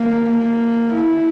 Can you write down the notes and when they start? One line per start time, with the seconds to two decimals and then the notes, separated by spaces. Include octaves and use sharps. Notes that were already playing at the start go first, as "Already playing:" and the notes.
Already playing: A#3
0.30 A#3
0.94 E4